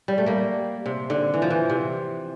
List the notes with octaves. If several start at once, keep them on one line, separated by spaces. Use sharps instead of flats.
G3
A3
G3 A#3
C3
D3
E3
F3
E3
C3